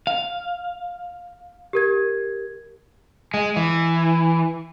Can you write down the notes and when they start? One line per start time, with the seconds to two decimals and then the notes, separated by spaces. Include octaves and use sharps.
0.07 F5
1.73 G4 A#4 G#6
3.34 G#3
3.56 E3